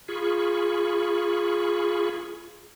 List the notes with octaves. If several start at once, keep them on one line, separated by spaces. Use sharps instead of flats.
F4 G#4 B5 C#6